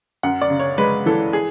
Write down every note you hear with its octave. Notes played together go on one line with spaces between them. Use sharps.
F#2 F#5
D5
C#3
C#5
G#3 B4
E3 A4
G#4